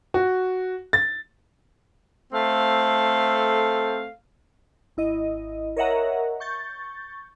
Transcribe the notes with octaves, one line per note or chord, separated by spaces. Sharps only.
F#4
A6
A3 C4 A4 F5
G#1 E4 D#5
A#4 C#5 D#5 E5 F#5 A#5
C#6 G6 A6